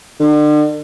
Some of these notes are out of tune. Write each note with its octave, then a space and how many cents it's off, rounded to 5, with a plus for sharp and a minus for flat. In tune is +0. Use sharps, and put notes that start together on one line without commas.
D3 +40